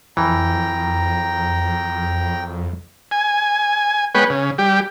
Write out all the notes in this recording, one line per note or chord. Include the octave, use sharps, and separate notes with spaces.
F2 E3 G5 A#5
G#5
G#3 B3 B4 C#5 G5
C#3
G3 G4